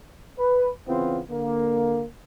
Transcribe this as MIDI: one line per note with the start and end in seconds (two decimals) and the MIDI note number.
0.38 0.70 71
0.87 1.20 49
0.87 1.20 52
0.87 1.20 59
0.87 1.20 60
0.87 1.20 65
1.30 2.04 50
1.30 2.04 58